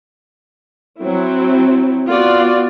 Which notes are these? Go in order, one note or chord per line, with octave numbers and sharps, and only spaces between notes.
F#3 C4 E4
B3 F4 F#4 D5